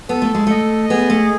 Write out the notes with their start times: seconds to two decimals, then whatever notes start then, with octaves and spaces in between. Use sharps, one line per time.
0.09 B3 A4
0.22 A3
0.35 G#3
0.47 A3 D#5
0.90 B3 G#4
1.10 A3